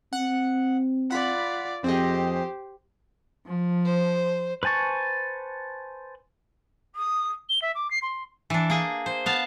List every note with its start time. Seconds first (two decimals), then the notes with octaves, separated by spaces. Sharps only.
0.13 C4 F#5
1.10 F4 D5 F#5 B5
1.84 F2 C4 G4 G#4 C5 D#5
3.47 F3
3.85 C5
4.63 B4 C5 G#5 A5 C#6
6.95 D#6
7.49 G7
7.62 E5
7.75 D6
7.91 C7
8.02 C6
8.50 E3 D4
8.70 A#3 G#4
9.06 C5
9.26 B3 F5 A5